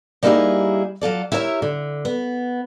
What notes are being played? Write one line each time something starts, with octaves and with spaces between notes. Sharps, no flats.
G3 A#3 D#4 E4 G4 G#4
F#3 F4 A4 D5
E4 G4 A#4 C#5 D#5 E5
D3
B3